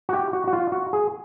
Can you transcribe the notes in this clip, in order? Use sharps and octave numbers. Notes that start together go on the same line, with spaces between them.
F#4
G4
F#4
F#4
F4
F#4
G#4